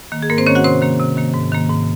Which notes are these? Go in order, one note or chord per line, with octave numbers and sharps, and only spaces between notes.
D#3 A#3
G#4
G#2 A#3 A#4
C4 C5
D#3 A#3 C#4 C#5
F#4 F#5
C3 C5 C6
D#3 A#3
C3
D#3 A#3
G#2
D#3 A#3
G#2